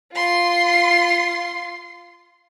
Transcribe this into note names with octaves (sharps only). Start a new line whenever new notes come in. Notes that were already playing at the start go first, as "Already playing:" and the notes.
F4 C6